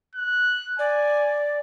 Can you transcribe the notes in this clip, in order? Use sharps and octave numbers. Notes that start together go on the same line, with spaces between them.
F#6
D5 G#5